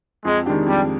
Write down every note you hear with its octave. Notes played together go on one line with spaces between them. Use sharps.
F2 G#3
D#3 G#3 D4 G4
F2 G3